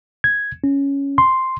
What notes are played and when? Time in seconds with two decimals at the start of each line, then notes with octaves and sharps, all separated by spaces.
0.24 G#6
0.64 C#4
1.18 C6